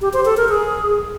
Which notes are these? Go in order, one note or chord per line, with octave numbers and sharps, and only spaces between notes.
G4
C5
A4
A#4
G#4